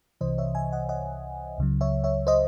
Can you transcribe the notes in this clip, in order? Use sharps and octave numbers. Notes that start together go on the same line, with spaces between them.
C2 C3 E3 C5 D#5
C#5 E5
E5 G#5
D#5 F#5
D#5 F#5
C#2 C#3 F#3
C#5 E5
C#5 E5
C5 D#5